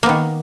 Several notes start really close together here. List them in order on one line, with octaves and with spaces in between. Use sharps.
A#3 B3 D#3